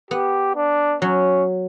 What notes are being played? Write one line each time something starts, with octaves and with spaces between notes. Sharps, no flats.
B3 G4
D4
F#3 C#4